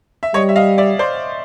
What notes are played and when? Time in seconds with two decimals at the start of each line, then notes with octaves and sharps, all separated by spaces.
0.23 E5
0.34 G3 C#5 D#5
0.49 E5
0.56 D#5 F5
0.78 D5 E5
0.99 C5 D5